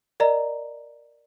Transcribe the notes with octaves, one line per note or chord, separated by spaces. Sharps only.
A#4 D5 D#5 A#5